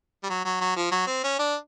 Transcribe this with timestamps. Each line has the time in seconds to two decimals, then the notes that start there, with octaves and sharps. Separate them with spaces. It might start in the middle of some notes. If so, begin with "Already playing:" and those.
0.23 G3
0.30 F#3
0.45 F#3
0.61 F#3
0.76 F3
0.91 F#3
1.07 C4
1.24 C#4
1.39 D4